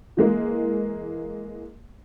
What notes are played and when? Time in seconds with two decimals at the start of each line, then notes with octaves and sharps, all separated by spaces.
0.17 E3 G#3 A#3